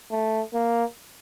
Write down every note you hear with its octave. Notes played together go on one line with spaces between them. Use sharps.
A3
A#3